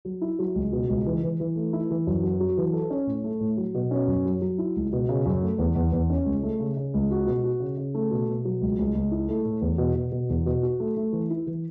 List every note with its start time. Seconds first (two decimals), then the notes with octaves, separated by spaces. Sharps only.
0.05 F#3
0.21 E4
0.39 F#3
0.55 C#2
0.72 B2
0.89 C#2
1.06 E3
1.23 E3
1.40 E3
1.56 A3
1.73 E4
1.90 E3
2.07 F#2
2.23 F#4
2.40 F#3
2.58 E3
2.73 A4
2.90 C#4
3.07 A2
3.24 A3
3.40 A2
3.57 F#3
3.74 B2
3.91 C#4
4.07 F#2
4.25 F#3
4.41 F#3
4.58 E4
4.76 C#2
4.93 B2
5.09 C#3
5.26 F#2
5.42 A3
5.59 E2
5.75 E2
5.92 E2
6.10 C#4
6.26 C#2
6.43 A3
6.59 C#3
6.77 C#3
6.94 C#2
7.11 F#4
7.26 B2
7.44 F#4
7.60 C#3
7.77 C#3
7.94 A3
8.11 B2
8.28 B2
8.45 F#3
8.61 C#2
8.79 C#2
8.95 C#2
9.11 E4
9.28 A3
9.45 A2
9.61 E2
9.78 B2
9.95 B2
10.12 B2
10.29 E2
10.46 B2
10.63 F#4
10.80 A3
10.97 A3
11.12 E3
11.30 E4
11.47 E3